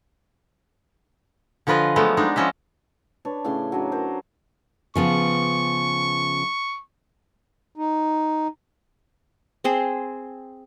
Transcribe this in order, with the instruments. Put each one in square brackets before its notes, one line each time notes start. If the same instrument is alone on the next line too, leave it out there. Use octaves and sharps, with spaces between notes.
[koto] D3 F3 F4 B4 D#5 G#5
F3 F#3 G#3 A3 B3
G#3 D4 D#4
F3 B3 C#4 D#5 E5
[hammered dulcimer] D4 B4 C#5 D5
A2 C#3 C6 D6
F#3 D4
A#4 C5
[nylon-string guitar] C#3 F3 B3 [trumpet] C#6
[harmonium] D#4
[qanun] C4 G#4 C5